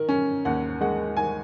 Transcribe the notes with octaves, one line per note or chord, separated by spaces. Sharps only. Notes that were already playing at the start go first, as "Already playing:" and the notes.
Already playing: D#3 A#4
C#4
D#2 F#5
G#3 F#5
D#3 G#5